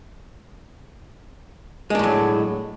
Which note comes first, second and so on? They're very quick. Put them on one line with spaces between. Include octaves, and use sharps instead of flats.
G#3 D4 A2 F#3